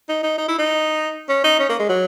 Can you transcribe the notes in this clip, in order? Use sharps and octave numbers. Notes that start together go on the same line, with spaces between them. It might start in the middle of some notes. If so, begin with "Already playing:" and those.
D#4
D#4
D#4
E4
D#4
C#4
D#4
C#4
A#3
G#3
F#3